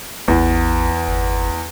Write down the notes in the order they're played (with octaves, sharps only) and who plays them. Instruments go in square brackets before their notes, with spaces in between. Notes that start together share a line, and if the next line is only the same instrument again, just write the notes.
[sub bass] A1 [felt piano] E2
[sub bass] G1